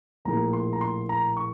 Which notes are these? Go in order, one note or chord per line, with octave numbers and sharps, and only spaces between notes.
A#1 A2 F3 A#3 A#5
C6
A#5
C6
A#5
C#6